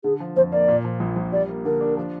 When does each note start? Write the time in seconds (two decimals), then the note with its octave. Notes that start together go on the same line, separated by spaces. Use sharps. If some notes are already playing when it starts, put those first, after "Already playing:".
0.04 D3 G#4
0.20 F3
0.36 F2 C5
0.52 A#3 D5
0.68 A#2
0.85 F3
1.00 A#1
1.16 A#1
1.32 G3 D5
1.49 A#3
1.65 D3 A#4
1.81 D4
1.97 F3